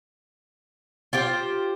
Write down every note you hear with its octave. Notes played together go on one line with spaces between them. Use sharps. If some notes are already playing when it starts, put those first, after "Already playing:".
F4 G4 C5